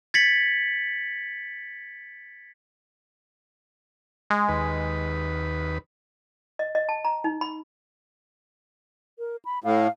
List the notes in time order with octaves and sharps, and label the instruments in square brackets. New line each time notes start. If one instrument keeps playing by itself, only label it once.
[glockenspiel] G#6 A6 B6 C#7 F#7
[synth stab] G#3
[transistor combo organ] D#2 B4
[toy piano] D#5
D#5
A5
A#5
D#4
B5
[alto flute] A#4
B5
[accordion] A2 [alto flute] F5